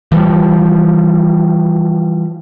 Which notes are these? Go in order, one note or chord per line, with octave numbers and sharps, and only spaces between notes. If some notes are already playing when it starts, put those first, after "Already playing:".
E3 F3 G3